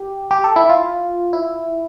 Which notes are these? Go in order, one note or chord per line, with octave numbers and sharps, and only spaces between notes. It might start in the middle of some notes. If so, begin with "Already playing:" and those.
Already playing: G4
G4
A4
E4
F4
E4